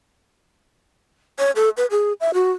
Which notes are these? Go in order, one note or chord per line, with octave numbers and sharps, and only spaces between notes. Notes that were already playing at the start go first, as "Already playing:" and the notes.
C#5
A4
B4
G#4
E5
F#4